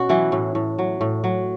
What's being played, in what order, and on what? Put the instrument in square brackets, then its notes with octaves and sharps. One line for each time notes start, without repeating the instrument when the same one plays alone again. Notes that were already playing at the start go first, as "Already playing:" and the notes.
Already playing: [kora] B2 C#4 F#4
E3 F#3 E4
A2
A2
F#3
A2
F#3